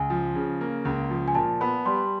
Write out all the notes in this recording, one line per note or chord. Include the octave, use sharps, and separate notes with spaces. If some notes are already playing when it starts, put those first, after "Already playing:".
Already playing: C#2 G#5
F3
C#3
A#3
C#2
F3
G#5
A#2 A5
B3 B5
G3 C6